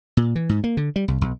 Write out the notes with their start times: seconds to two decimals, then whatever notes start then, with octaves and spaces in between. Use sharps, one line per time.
0.17 A#2
0.36 E3
0.49 G#2
0.64 A#3
0.77 D3
0.96 G3
1.08 C2
1.21 B1